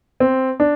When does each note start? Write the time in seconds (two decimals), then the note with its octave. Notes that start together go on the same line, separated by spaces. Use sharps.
0.20 C4
0.60 D4